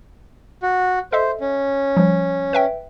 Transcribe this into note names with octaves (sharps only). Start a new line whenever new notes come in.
F#4
A4 C5 D#5 E5
C#4
F3 G3
B4 E5 G5